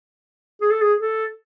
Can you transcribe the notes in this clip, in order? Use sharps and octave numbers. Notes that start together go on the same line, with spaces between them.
G#4
A4
G#4
A4